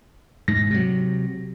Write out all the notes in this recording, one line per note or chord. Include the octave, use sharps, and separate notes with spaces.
G#2 A#6
C3 F#3